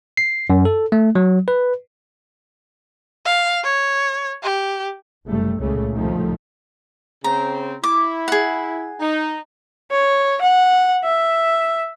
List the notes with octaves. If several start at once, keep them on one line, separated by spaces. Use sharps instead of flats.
C7
F#2
A4
A3
F#3
B4
F5
C#5
G4
F#1 C3 G3 A3
C#2 A#2 C#3 A3
F1 C2 A2 D#3 F3 A3
C#3 C4 A#5
E4 D6
G#4 F#5
D#4
C#5
F#5
E5